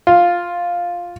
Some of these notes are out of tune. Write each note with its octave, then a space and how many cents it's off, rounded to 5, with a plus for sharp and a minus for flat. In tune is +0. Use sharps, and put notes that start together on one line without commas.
F4 +5